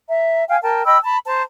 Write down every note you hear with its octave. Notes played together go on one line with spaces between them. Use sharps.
E5 A#5
F5 G5 G#5
A#4 G5 A5
D#5 G5 B5 E6
A5 B5
C5 A5 A#5